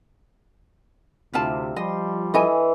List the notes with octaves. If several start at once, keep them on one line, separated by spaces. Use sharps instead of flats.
D2 C3 E4 F4 A5
F3 G3 D#5 C6
E3 A4 D#5 G#5